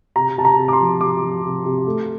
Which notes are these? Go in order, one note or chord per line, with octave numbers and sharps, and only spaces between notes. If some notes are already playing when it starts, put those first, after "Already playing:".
C3 A#5
C3 A5
A#5
C3
D6
C6
F3
C3 D6
F3
C3
C3
A3